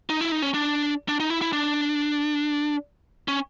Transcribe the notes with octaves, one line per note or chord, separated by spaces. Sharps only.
D#4
E4
D#4
C#4
D4
D4
D#4
E4
E4
D4
C#4